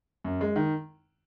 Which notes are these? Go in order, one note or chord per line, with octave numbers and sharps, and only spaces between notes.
F#2
G#3
D#3